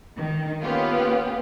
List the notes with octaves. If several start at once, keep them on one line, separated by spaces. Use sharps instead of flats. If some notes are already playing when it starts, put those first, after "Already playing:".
D#3
A#3 B3 C#4 F4 G4